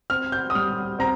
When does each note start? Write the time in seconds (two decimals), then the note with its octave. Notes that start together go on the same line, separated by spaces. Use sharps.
0.10 C4 F6
0.32 G6
0.50 D#6
0.55 G3 F6
0.99 C4 A#5